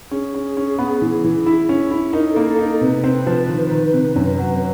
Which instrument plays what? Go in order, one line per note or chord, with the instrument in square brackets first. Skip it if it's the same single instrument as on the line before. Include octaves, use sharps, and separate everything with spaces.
[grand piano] C#4 [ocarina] G#4
[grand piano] C#4
C#4
B3
E3
E3
E4
C#4
E4
[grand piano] D#4 [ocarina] A#4
[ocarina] A4
[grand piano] A#3
[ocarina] A4
[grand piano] D#4
[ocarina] A4
[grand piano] C3 [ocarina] B4
[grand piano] C4
F3
D#3
D#3
C3
F#2
F#3